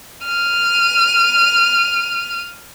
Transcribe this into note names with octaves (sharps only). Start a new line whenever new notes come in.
F6 D#7